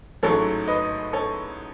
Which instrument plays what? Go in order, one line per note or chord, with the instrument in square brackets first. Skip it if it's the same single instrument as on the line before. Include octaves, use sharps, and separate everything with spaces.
[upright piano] A1 G#2 F#3 A3 A4 C#5
B4 D#5
A4 C#5